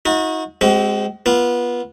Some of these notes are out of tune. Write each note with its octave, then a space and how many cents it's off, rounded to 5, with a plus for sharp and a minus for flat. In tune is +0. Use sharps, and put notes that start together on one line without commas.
D#4 +35 F#4 -30
G#3 +0 C4 +0 F#4 +45
B3 -25 F4 -15